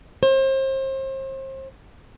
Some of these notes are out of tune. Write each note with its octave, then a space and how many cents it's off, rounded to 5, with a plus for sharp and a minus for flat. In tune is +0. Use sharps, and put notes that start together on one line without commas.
C5 +35